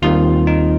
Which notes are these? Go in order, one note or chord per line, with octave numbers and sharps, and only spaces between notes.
D#2 D#3 G3 C4 F4
D#4